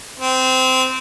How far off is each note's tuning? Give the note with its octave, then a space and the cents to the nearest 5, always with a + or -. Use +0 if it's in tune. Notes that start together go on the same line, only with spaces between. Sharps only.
C4 -15